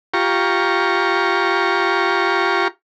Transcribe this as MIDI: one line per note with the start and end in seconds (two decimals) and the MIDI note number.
0.14 2.68 65
0.14 2.68 67
0.14 2.68 82
0.14 2.68 85